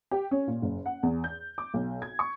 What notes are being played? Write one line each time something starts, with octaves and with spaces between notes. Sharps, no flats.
G4
C#4
A#2
F#1
F#5
E2
G6
D6
B1
G#6
C#6